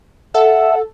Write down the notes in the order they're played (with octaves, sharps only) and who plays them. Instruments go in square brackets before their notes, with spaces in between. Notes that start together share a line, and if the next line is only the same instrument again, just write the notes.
[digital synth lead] A4 [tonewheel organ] E5 [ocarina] F#5